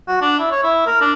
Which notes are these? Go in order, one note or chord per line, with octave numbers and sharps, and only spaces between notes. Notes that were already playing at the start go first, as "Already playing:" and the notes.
F#4
D4
E4
C#5
E4
A#4
D4